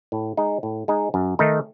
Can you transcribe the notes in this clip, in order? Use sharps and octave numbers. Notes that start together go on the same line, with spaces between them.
A2
G#3 D#4
A2
G#3 D#4
F#2
D#3 A3 D#4